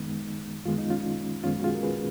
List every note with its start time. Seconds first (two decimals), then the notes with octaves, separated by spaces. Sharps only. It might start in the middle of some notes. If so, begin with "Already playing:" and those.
Already playing: F#2 D#3 G#3 B3 D#4
0.65 F#2 D#3 G#3 B3 F4
0.78 D#4
0.90 C#4 F4
1.44 F#2 D#3 G#3 B3 C#4 F4
1.58 F#4
1.64 F4 G#4
1.74 A#4
1.83 G#4 B4